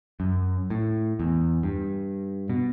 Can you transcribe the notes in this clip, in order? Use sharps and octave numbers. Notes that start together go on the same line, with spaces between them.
F#2
A2
E2
G2
B2